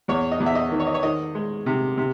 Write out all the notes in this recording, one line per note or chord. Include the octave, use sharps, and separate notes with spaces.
E2 C#5
D#5
E2
E5
D#5
D#3
C#5
D#5
C#5
D#3 D#5
G#3
C3
C3